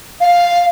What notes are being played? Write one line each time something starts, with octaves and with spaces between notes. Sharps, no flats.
F5